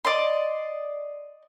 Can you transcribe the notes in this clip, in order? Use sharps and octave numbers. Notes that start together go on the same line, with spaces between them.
D5 D#5 C6